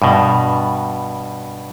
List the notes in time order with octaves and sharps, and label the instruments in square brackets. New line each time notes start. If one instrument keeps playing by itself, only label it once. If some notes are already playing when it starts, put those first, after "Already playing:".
[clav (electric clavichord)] G2 B2